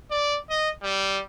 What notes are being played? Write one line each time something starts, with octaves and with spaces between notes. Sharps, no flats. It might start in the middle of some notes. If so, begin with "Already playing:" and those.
D5
D#5
G3